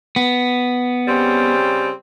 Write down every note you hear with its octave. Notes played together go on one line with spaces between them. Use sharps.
B3
C#3 G3 C4